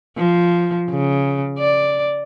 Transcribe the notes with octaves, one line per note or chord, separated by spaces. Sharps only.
F3
C#3
D5